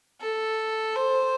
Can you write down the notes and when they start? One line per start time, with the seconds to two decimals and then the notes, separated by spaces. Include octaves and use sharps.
0.21 A4
0.96 C5